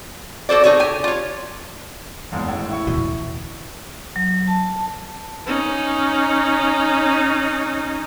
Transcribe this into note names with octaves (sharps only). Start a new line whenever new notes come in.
F#4 A4 C5 D5
D#4 F#4 G#4 A4 C#5
G4 G#5
F4 C#5
F#1 E2 G#3
A1 A2
E4 C#6
D1 E2 B2
F#3
A5
C#4 D#4